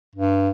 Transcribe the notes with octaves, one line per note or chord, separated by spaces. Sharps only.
G2